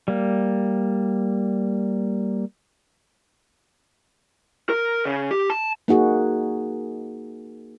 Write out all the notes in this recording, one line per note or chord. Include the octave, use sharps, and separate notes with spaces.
G3 A#3
A#4
C#3
G4
A5
A#3 D#4 F#4 G#4